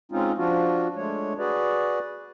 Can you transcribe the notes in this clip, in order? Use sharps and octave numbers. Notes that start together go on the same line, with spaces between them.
G#3 C4 C#4 D#4 F4
F3 D4 F4 F#4
G#3 A3 D4 C#5
F#4 G#4 B4 D5